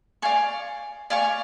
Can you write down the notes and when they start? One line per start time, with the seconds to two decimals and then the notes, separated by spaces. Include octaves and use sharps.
0.22 D5 F5 G#5 C#6
1.10 D5 F5 G#5 C#6